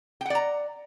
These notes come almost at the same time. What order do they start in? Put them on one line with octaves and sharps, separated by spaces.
G5 F#5 D5 A#5